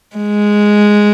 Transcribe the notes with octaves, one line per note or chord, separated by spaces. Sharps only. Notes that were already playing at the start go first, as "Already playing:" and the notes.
G#3